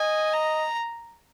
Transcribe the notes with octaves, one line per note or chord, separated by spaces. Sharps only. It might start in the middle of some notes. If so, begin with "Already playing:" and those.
Already playing: D#5 G#5
A#5